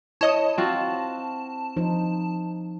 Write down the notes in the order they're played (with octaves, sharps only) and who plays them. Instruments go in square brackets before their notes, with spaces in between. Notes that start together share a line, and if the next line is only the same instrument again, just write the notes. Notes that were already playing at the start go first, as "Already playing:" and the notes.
[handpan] E4 [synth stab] C#5 D#5 D#6 [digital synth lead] A5
[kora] C4 F4 F#4
[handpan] F3 D#4 C5